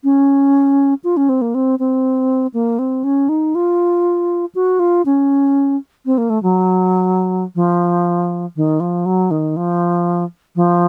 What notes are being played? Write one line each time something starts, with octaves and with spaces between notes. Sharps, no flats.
C#4
F4
C#4
C4
A#3
C4
C4
A#3
C4
C#4
D#4
F4
F#4
F4
C#4
C4
A#3
A3
F#3
F3
D#3
F3
F#3
D#3
F3
F3